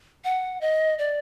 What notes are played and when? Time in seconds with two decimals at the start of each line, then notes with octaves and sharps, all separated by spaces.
0.24 F#5
0.61 D#5
0.99 D5